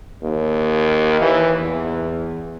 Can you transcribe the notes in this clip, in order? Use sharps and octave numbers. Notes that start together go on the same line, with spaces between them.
D#2
E3
E2